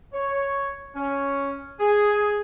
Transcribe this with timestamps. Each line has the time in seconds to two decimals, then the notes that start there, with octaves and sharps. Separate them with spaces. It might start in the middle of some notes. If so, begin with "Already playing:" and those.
0.13 C#5
0.95 C#4
1.80 G#4